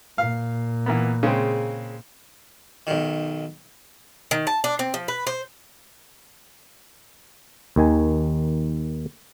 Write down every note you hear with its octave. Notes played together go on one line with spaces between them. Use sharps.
A#2 F5
E3 A#3 B3
C#3 G#3 C4
B1 D#3
D#3
A5
D4
C4
F3
B4
C5
D#2 D#3 G#5